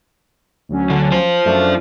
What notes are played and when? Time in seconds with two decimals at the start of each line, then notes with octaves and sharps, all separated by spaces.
0.69 D2 F#3 C#4
0.90 D3
1.12 F4 C5
1.45 F#2 A3 D4